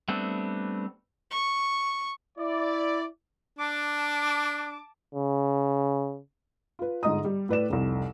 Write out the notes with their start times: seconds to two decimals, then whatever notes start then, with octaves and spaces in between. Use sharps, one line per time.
0.08 G3 A3 B3 C4 D4
1.31 C#6
2.38 E4 D5
3.59 D4 A5 D6
5.15 C#3
6.79 F4 B4
7.03 G1 G#2 D#5 A#5 D#6
7.24 G3
7.49 A2 B4 D5 E7
7.70 F1 C2